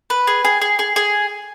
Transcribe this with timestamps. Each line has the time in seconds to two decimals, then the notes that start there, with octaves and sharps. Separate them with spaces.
0.10 B4
0.27 G#4
0.45 G#4
0.62 G#4
0.79 G#4
0.96 G#4